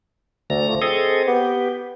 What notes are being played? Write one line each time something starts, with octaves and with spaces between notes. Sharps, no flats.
D2 D3 A3 A#5
F3
C4 G#4 A4 D#5
B3 G4